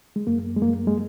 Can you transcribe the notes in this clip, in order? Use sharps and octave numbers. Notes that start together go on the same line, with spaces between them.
G#3
F#2 A#3
G#3
F#2 A#3
G#3